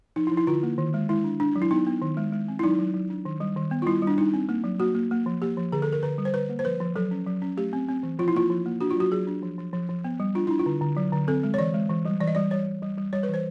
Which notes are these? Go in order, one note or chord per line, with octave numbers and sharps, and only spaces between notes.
F3 D#4
E4
F3
E4
D3 F4
A#3
D#3
G#3
G#3 E4
D4
D4
F#3
E4
B3 D#4
B3
D#3
G#3
G#3
C4
E4
F#3 D#4
F#3
F#3
D4
D#3
G3
D#3
B3
F4
G3 E4
G3
D4
G3 D#4
C4
A#3
F#3
A#3 F#4
A#3
A#3
F3
A#3 G4
F3
D3 G#4
A4
D3
A#4
D3 B4
G3
C5
D3 B4
A#3
C5
F3 B4
F3
F#3 A4
C#4
F#3
C#4
A3 G4
C4
C4
E3
F3 F4
E4
A#3 F4
F3
A#3
D4 F#4
F4
F#3 F#4
F#3 G#4
D4
F3
F3
F3
F3
B3
G3
D4 F4
D4 E4
F4
D3
D3
F#3
D3
C4 A4
G#3
C#5
E3 D5
G#3
E3
G3
E3 D5
D#5
G3 D5
G3 C#5
G3
G3
G3
G3 C#5
B4
E3
C5